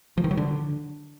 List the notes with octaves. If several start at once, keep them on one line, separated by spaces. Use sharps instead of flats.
F3
D#3
F#3
D3